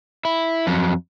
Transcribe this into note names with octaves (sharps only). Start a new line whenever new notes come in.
E4
F2 F#3